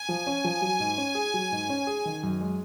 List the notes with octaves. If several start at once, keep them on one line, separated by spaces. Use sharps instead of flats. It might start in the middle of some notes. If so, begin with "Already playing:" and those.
Already playing: G#5
F3
C#4
F3
F#3
G#2
C#4
G#4
F#3
G#2
C#4
G#4
D#3
F#2
G#3